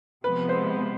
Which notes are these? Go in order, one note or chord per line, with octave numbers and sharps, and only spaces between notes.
C3 F3 G#3 B3 B4
C5